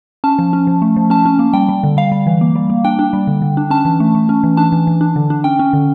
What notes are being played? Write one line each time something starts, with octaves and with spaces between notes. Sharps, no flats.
C#4 A5
F3
C#4
F3
A3
F3
C#4 A5
C#4
A#3
G3 G5
G3
D3
G3 F5
G3
E3
A#3
G3
A#3
D4 G5
D4
G3
D3
D3
D4
C#4 A5
E3
A3
A3
C#4
E3
D4 A5
E3
E3
D4
D3
D4
C#4 G5
C#4
D3